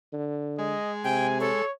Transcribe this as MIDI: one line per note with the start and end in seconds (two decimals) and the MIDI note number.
0.13 0.75 50
0.59 1.62 56
0.59 0.92 75
1.04 1.49 48
1.04 1.27 79
1.04 1.37 80
1.40 1.64 69
1.40 1.71 73